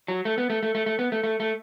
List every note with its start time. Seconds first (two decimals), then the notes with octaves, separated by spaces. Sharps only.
0.08 F#3
0.25 A3
0.38 B3
0.50 A3
0.63 A3
0.75 A3
0.86 A3
0.99 B3
1.12 A3
1.24 A3
1.40 A3